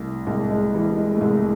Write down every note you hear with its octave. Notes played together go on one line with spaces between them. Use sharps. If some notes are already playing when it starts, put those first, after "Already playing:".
Already playing: C2 A3
C2 G#3
G#3
E3 G3
G#3
A3
C2 G#3